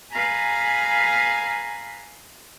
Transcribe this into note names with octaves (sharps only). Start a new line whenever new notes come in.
G#4 B4 F5 G#5 A#5 B5